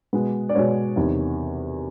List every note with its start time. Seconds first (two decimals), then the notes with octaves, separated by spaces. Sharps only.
0.13 B2 G#3 B3
0.49 D5
0.54 B2 G#3 B3 C#5
0.96 E2 C3 D#3